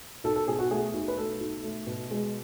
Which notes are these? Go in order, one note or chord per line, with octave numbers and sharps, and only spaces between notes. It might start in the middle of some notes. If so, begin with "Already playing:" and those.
B1 A4
A4
B2 G#4
F#4
A3 G#4
B1
B4
A3 A4
B1
A3
B2
G#3